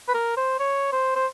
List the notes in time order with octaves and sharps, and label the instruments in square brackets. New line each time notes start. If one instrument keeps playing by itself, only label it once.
[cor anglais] B4
A#4
C5
C#5
C5
C5